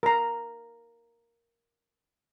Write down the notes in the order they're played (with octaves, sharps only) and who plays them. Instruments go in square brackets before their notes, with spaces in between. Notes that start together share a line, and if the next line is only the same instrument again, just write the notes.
[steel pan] A#4 A#5